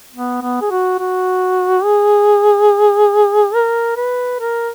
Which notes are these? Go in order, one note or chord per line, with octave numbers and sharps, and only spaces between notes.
B3
B3
G#4
F#4
F#4
G#4
A#4
B4
A#4